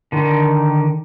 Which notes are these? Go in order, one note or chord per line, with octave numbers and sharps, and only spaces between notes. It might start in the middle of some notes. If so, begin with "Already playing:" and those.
D3 D#3